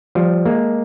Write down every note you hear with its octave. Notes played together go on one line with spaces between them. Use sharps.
F3 G3
G#3 A#3